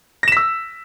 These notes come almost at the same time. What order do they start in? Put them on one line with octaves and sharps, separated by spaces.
A#6 E7 B6 E6